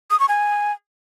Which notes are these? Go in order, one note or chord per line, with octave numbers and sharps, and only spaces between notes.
D#6
C#6
G#5